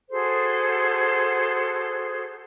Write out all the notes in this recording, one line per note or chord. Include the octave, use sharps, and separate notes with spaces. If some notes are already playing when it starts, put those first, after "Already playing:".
F#4 G#4 A4 C5